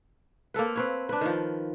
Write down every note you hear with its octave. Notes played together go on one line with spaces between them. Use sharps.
A#3 C4 A4 B4
C4 B4 C#5
D4 B4
D#3 F3